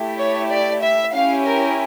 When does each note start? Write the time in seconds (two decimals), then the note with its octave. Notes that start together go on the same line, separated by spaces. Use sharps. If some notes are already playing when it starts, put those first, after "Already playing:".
Already playing: A3 E4 G4
0.19 C#5
0.51 D5
0.82 E5
1.14 C#4 E4 G4 F5
1.46 A#4